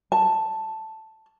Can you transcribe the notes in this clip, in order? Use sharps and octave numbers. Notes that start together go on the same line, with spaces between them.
A5